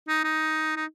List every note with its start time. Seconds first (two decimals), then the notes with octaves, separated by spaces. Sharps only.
0.08 D#4
0.24 D#4
0.76 D#4